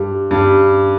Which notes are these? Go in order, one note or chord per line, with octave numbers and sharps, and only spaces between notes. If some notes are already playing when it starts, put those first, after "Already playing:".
Already playing: G2 G3
G2 G3